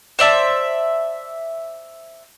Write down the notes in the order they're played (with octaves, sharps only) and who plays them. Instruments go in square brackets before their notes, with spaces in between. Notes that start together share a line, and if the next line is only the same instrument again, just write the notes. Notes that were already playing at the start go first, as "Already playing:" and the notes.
[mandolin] C5 D5 E5 A5